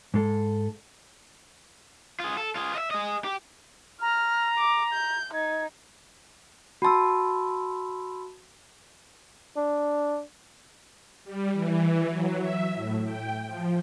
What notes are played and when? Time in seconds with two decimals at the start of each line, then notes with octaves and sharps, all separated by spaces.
0.14 G#2 G#3 A4
2.20 F4 G#4
2.37 A4
2.56 F4 G#4
2.74 D#5 E5
2.91 G#4 D#5
3.24 G4
4.02 A#5 F6
4.58 D6
4.93 G6
5.34 D#4 G#6
6.82 F#4 A5 B5 C6 E6
9.56 D4
11.24 G3
11.53 E3
12.09 F#3
12.40 E5
12.75 A2
13.04 G5
13.46 F3